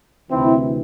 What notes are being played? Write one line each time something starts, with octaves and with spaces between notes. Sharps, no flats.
D2 C3 E3 C4 E4